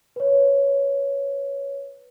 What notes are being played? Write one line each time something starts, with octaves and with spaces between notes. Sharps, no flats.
B4 C#5